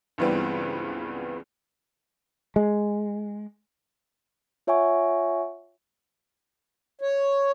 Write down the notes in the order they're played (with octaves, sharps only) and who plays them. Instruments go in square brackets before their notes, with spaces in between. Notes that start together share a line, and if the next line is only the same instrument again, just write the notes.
[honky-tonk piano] C#2 G2 E3 G3 B3 C4
[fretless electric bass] G#3
[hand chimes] F4 C#5 E5 F#5 G#5 C#6
[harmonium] C#5